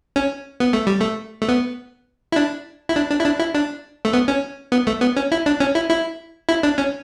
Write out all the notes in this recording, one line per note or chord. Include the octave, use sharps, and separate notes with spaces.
C#4
B3
A3
G3
A3
A3
B3
E4
D4
E4
D4
D4
E4
D4
E4
D4
A3
B3
C#4
B3
A3
B3
C#4
E4
D4
C#4
E4
E4
E4
D4
C#4